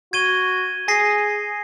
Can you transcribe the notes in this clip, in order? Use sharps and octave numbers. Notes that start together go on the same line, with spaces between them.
F#4 G#6 D#7 G7
G#4 G#5 A#6 C7